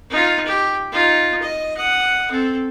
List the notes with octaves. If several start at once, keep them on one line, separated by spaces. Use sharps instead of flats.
D#4 F4
G4
D#4 F4
D#5
F#5 D#6
C4 A4